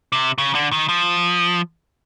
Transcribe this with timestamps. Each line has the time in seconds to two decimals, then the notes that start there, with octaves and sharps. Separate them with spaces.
0.12 C3
0.38 C#3
0.55 D3
0.72 D#3
0.89 F3